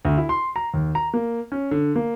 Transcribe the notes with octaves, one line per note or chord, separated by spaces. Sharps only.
D2
E4
C6
A#5
D#2
A#5
A#3
C#4
D3
A#3